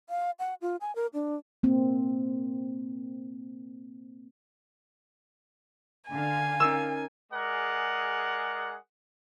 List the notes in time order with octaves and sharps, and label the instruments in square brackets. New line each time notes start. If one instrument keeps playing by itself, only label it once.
[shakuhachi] F5
F#5
F4
G#5
A#4
D4
[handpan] A#3 C4
[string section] D3 F5 [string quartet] G#5
[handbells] C#4 D#4 A#4 [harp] E6
[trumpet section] G#3 G#4 A#4 D5 F#5